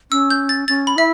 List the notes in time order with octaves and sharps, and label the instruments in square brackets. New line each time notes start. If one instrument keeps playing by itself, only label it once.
[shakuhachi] C#4 [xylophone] E6
[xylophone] G6
A6
[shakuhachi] C#4 [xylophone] A6
[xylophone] B5
[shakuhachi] E4 [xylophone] E5